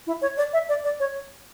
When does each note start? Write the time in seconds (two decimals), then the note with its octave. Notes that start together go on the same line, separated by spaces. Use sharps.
0.07 E4
0.22 C#5
0.37 D5
0.53 E5
0.69 D5
0.84 D5
1.00 C#5